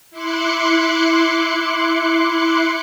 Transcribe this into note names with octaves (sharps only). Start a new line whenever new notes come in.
E4 C6 D6 F#6 C#7